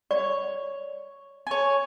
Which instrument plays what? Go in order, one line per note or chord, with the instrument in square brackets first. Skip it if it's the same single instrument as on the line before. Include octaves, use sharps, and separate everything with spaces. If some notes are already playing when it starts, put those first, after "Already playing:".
[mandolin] C#5 [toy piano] D5
[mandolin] C#5 G#5